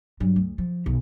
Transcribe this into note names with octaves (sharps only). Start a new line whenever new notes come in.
G2 F#3
D2
F3
B1